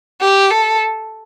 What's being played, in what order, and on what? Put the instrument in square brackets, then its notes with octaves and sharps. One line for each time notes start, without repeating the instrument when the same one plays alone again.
[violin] G4
A4